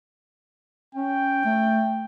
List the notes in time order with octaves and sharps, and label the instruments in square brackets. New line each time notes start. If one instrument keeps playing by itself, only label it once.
[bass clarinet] C#4 [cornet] G5
[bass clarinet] A3